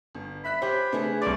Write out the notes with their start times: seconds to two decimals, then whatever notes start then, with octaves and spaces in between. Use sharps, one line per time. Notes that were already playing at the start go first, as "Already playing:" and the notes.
0.15 G1
0.44 E5 B5 F#6 B6
0.62 C#4 F4 G4 C5 E5 G6
0.92 C#3 E3 A3 B3 D4 G#4
1.22 C2 D3 F4 G#4 D5 D6